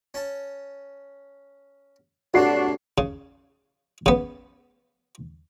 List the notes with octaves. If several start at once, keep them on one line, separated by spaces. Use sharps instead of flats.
C#4 A5
C2 A2 F#3 D4 F#4 C7
C#3
C#3 B3